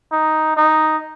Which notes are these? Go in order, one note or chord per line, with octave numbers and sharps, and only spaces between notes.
D#4
D#4